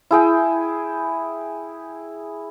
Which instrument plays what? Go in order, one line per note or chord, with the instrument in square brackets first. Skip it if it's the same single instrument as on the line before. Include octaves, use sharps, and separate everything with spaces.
[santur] E4 G#4 G5